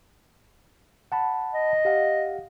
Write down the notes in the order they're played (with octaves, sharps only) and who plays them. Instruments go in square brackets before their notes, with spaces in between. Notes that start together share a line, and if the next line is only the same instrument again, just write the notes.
[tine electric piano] F#5 A5 B5
[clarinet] D#5
[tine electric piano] G4 F5 F#5